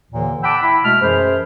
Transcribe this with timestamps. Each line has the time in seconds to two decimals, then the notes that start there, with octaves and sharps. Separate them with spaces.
0.11 D#2 A#2 D3 E3
0.43 F#5 G5 A5 B5 D6 E6
0.62 E4 B5
0.84 B2 G#3 A3 A5 B5 F6
1.01 F#2 E3 G#4 C5